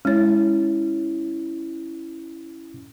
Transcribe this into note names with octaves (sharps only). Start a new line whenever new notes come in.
G#3 C#4 E4 C#5